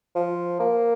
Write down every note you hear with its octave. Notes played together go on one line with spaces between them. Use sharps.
F3
A#3